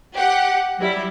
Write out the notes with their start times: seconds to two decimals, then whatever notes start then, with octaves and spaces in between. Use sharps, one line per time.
0.15 G4 F#5
0.78 F#3 G3 E4